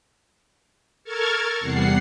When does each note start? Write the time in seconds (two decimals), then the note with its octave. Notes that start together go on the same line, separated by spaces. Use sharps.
1.04 A4 A#4 A5 C#6 F6 G#6
1.60 E2 C3 G3 F#5 C7